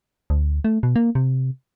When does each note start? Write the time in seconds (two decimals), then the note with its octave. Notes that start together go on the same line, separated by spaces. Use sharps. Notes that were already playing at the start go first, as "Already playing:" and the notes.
0.30 D2
0.65 A3
0.83 B2
0.96 A#3
1.15 C3